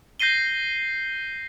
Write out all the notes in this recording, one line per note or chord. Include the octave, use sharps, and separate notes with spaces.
G6 A#6 C7 D#7 G7